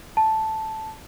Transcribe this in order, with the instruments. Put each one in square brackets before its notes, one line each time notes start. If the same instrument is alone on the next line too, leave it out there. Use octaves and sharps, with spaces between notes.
[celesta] A5